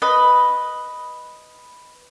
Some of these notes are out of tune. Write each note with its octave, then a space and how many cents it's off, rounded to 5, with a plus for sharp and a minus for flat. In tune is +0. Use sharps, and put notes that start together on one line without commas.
B4 +0 D#5 +0